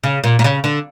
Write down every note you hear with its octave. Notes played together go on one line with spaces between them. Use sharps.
C#3
A#2
A#2
C#3
D3